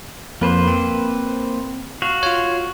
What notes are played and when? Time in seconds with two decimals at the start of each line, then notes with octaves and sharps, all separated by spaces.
0.41 F2 A#3 B4 C5
0.68 C4
2.02 F#4 F5
2.23 F4 C#5